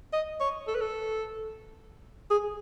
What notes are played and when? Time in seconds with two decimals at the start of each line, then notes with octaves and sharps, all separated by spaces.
0.13 D#5
0.41 C#5
0.68 A4
0.75 B4
0.81 A4
2.31 G#4